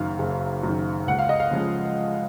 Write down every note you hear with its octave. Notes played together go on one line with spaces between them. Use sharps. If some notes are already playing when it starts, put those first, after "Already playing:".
Already playing: F#1 F#2 D#3 F5
F#1
F#2 D#3
C#2 F#5
F5
D#5
F5
C#3 F3 G#3